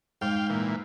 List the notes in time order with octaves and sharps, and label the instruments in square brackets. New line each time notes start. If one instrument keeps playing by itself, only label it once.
[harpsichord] G#2 [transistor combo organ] F5 G5
[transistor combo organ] A#2 E3